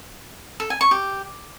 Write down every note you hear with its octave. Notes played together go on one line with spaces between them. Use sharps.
A4
G#5
C#6
G4